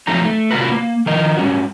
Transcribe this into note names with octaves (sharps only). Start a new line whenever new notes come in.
F3 F#3 A3 C4 D#4 A#5
A3
C3 F4 F#4 A#4 B4
A#3
D#3 F3 A#4 D#5
G3 C#4 F#4